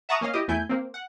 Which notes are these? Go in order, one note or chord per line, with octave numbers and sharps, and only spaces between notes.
E5 F#5 A5 A#5 C#6 D#6
A#3 C#4 D#5 F5
E4 G4 D#5
E2 A3 E4 G#5 G6
A#3 C4
F#5